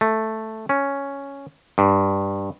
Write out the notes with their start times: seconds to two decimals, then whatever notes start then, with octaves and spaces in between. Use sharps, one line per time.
0.01 A3
0.69 C#4
1.78 G2